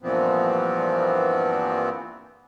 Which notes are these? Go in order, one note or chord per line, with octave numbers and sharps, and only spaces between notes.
G2 A#2 E3 F3 B3 C4